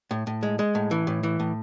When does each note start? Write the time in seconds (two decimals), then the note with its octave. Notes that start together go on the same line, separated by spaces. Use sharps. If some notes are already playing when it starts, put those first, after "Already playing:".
0.11 A2
0.27 A2
0.43 G#3
0.59 G#3
0.75 A2
0.91 E3
1.07 A2
1.23 E3
1.40 A2